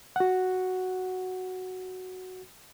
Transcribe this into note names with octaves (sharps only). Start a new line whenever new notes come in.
F#4 F#5